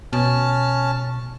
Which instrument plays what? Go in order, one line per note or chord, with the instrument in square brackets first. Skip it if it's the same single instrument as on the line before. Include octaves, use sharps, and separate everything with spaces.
[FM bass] B2 [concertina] C#4 A5 F6